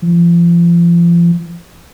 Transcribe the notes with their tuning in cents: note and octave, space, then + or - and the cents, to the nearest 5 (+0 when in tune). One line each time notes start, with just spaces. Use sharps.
F3 -35